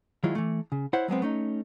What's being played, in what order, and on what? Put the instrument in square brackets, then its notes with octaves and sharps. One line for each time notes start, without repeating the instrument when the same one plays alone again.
[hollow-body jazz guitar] D#3 F#3 G#3 E4 F4
E3 A3
C#3
E4 C5 C#5 F#5
F#3 G#3 B3 C4
A3 C#4 D#4